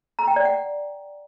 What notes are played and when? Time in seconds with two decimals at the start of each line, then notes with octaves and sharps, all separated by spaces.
0.19 A#5
0.27 G5
0.36 D5
0.45 F#5